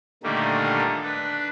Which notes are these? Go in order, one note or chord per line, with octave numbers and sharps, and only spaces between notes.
A#2 D3 D#3 G3 A3 A#3
D4 B4